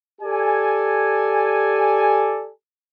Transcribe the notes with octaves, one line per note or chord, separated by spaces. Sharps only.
G4 A4 D5 G#5